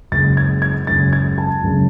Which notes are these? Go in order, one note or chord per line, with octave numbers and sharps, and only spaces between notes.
F#1 F#2 C#3 G#3 A6
G#6
G#6
F#1 F#2 C#3 G#3 A6
G#6
A5
F#1 F#2 C#3 G#3